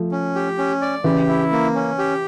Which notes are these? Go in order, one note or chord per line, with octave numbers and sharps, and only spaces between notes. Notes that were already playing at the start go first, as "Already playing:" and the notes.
Already playing: F3 A3
C#4
G4
C#4
D5
C#3 E3 G4
E4
A#3
C#4
G4